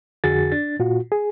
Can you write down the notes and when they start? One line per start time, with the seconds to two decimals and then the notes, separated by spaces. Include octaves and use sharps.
0.24 F2 D3 F#4 G#4 A6
0.52 D4 A6
0.79 A#2 F4 F#4
1.12 G#4